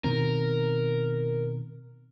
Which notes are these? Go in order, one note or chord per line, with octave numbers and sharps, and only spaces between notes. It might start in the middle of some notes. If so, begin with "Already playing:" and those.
B2 D#3 C4 A#4